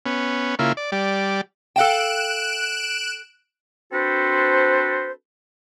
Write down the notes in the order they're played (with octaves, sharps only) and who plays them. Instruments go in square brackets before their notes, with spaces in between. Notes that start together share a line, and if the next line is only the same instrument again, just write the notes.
[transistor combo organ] B3 C#4
C#3 A#3 E4 F4
D5
G3 D5
[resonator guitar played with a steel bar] A4 F5 G5 [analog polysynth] F#6 D7 E7
[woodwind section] C4 D4 F#4 A4 B4 C5